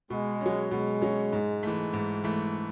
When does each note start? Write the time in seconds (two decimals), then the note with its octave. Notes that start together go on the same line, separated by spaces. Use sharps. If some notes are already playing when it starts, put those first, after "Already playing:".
0.10 B2 G#3
0.41 F#3 C#4
0.71 B2 G#3
1.02 F#3 C#4
1.33 G#2
1.63 E3 A3
1.94 G#2
2.24 E3 A3